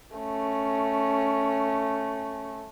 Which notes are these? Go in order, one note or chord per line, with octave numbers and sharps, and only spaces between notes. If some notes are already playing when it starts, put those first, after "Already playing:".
A3 C#4